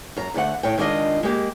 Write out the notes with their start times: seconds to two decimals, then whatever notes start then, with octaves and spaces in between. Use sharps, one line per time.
0.16 F#2 A#5
0.34 D2 D3 A3 F#5
0.63 A2 C#5 G5
0.78 D#3 G#3 D4 F4 D#5
1.23 G#3 A#3 G4